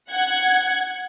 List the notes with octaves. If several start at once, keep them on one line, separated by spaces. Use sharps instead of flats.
F#5 G#6